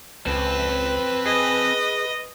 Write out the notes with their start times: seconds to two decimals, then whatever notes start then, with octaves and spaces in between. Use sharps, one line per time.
0.27 C#2 C4 A4 B4
1.26 G#4 D#5